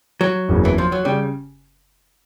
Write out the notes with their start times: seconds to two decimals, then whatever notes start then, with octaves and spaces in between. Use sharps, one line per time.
0.21 F#3
0.49 F#1 E2 C#3
0.65 E3
0.78 F3
0.92 F#3
1.05 C#3 G3